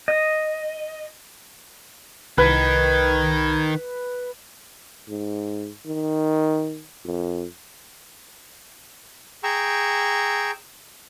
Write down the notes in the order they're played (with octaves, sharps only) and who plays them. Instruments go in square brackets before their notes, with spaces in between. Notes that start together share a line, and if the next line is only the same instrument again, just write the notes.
[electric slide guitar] D#5
[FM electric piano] C2 [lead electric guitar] D#3 D#4 [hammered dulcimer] B4 [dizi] G#6
[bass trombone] G#2
D#3
F2
[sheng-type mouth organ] G#4 G5 A#5 C#6 E6